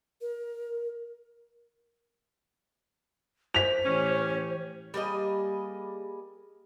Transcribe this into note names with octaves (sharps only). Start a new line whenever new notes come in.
A#4
C5 B6 F7
A2 E3 C#4 G4
G3 A#3 G#4 D#5